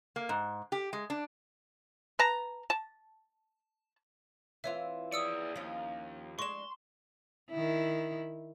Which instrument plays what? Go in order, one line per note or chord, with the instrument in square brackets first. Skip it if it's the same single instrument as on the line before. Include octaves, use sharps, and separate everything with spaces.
[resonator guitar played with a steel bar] A#3
G#2
G4
G#3
D4
[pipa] B4 A5 A#5
A5
[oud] E3 C4 F4 [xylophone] C#5 E5
[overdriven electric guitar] G#4 D5 [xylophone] D#6 E6 C#7
[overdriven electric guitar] D#2 [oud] F3 C#4
[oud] G#3 D4 [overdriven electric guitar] C6 [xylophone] C#6 E7
[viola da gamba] D#3 E4